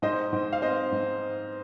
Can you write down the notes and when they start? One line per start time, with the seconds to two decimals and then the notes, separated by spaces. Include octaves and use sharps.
0.02 G#2 C5 D#5
0.33 G#2
0.53 F5
0.62 C4 C5 D#5
0.92 G#2